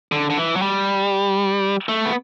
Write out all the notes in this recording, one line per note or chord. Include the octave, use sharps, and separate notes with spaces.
D3
D3
E3
F#3
G3
A3
B3